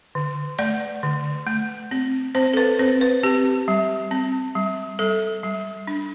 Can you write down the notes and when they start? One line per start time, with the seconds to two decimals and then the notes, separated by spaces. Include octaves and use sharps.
0.15 D3
0.59 A3 D5
1.03 D3
1.47 A3
1.91 C4
2.35 C4 C5
2.54 A4
2.57 B4
2.79 C4 C5
3.01 B4
3.23 C4 G4
3.68 G3
4.11 C4
4.55 G3
4.99 G3 A4
5.43 G3
5.87 D4